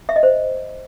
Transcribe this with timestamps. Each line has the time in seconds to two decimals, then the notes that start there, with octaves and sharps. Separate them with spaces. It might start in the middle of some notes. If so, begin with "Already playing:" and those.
0.09 E5
0.16 D#5
0.23 C5